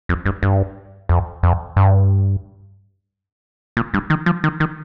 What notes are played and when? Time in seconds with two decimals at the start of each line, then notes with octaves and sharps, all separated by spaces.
0.09 F2
0.26 G2
0.43 G2
1.09 F2
1.43 F2
1.76 G2
3.77 A#2
3.94 G2
4.10 D#3
4.26 F3
4.44 D#3
4.60 D#3